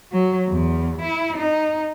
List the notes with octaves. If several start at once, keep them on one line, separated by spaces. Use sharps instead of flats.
F#3
E2
E4
D#4